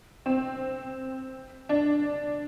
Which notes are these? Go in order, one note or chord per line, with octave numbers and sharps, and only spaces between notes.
C4
D4